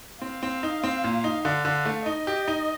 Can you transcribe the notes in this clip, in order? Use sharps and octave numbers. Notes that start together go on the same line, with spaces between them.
C4 F5
C4
D#4
C4
A#2
D#4
D3 F5
D3
A3
D#4 D#5
G4
D#4